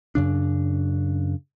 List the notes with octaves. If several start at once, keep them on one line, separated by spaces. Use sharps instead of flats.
F#2 C#3 D4